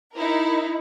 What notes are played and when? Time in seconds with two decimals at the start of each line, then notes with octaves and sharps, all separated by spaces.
0.14 D#4 E4 A#4